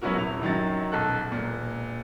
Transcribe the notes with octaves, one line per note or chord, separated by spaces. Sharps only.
F#3 B3 C#4 E4 F#4 A#4
D#1 C3 E4 F7
F#2 D#3 F#3 A6
D#1 B1 A4 F#6
E1 A#2